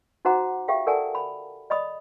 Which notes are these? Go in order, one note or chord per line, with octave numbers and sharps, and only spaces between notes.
D#4 F#4 C5 F#5 A#5 D6
G4 G#4 E5 F5 G5
A4 A#4 D5 F#5 G#5 A5
B5
D5 D#5 B5 D#6